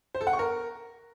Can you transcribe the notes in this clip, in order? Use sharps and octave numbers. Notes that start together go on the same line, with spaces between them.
C5
A4
F#5
C#6
A#4